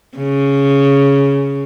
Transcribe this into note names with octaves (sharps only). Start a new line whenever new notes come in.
C#3